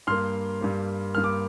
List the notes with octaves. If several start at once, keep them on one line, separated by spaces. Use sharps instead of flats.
G2 G3 A#3 C6 F6
G2 G3 A#3
G2 G3 A#3 F6
D6